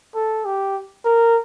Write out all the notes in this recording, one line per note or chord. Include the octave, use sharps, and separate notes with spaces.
A4
G4
A#4